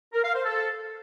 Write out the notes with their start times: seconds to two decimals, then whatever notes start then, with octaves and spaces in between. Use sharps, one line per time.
0.13 A#4
0.24 F5
0.34 C5
0.45 A4